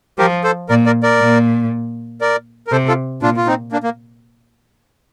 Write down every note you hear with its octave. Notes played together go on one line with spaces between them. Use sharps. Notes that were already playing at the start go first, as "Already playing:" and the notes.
F3 G4 A#4
A4 C5
A#2 A#4 D5
A#4 D5
A#4 D5
A#2
A#4 D5
A#4
C3 A4 C5
F4 A4
A#2 D4 F4
F4
C4 D#4
A#3 D4
A#3